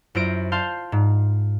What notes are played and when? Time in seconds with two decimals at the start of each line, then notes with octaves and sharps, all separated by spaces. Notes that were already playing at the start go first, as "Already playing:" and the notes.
0.15 F#2 E4 F4 C5 A#6 D7
0.52 F5 A5 C6 G6
0.92 G#2